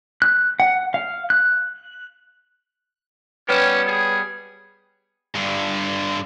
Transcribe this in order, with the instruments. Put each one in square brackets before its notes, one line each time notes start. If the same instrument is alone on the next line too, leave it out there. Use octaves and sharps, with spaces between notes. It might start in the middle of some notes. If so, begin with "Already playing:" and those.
[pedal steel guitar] F#6
F#5
F5
F#6
[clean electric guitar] G3 B3 G4 [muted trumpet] C#4 [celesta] B4 C#5 E7
[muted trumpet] G#4
[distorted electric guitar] G2 D3